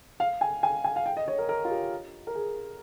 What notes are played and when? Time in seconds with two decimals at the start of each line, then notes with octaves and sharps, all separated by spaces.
0.20 F5
0.41 G#5
0.63 G#5
0.84 G#5
0.96 F5
1.06 G5
1.17 D#5
1.28 C#5
1.38 A#4
1.49 A#4
1.65 F4
1.70 G4
2.27 A#4
2.35 G#4